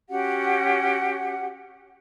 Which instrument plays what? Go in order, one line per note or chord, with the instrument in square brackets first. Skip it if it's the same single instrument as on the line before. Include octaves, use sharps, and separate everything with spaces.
[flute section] C#4 F#4 G4 F#5